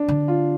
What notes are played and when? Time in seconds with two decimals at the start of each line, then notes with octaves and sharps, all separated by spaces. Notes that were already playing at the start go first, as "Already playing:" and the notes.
Already playing: D4
0.08 D3
0.28 F4